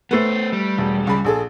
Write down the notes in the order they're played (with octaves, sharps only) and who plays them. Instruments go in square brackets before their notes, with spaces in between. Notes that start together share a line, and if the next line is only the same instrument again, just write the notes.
[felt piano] A3 B4 [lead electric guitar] B3 C5
[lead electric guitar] G3
[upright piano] E1
C#2 B5
A#1 G#4 A4